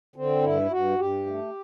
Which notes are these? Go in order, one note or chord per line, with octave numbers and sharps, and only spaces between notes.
D3 C4
G2 E4
G2 F#4
G2 G4
A3